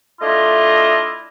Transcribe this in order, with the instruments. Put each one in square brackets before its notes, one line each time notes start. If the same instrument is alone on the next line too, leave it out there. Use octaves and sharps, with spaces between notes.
[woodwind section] A3 D4 E4 F4 D#5